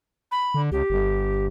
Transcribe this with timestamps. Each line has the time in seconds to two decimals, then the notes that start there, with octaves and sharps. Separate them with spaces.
0.32 B5
0.54 D3
0.72 C#2 G4
0.90 G1